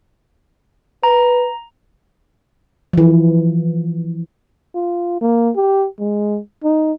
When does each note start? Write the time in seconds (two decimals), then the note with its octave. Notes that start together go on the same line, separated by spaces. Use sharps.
1.03 B4 A#5
2.93 E3 F3
4.75 F4
5.21 A#3
5.56 G4
5.99 G#3
6.64 D#4